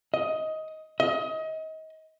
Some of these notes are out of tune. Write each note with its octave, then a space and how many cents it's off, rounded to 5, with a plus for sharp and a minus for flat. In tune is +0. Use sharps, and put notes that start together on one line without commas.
D#5 +15
D#5 +30